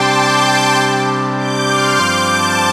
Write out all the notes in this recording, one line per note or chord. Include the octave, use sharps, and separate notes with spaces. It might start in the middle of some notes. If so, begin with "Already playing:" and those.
Already playing: C3 G3 D4 G5 A5 C6 D6
D6 G6
D6 G6
C6 F6
G2 F3 C4 D6 G6
A5 D6